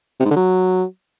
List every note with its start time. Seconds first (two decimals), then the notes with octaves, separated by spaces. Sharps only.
0.20 C3
0.25 G#2
0.31 D3
0.36 F#3